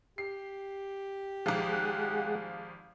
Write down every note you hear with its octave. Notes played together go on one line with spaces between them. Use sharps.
G4 C7
G#1 F3 G#3 G#4 F#5